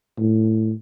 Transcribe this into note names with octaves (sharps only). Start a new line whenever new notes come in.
A2